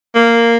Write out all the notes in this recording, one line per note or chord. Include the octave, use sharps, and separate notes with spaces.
A#3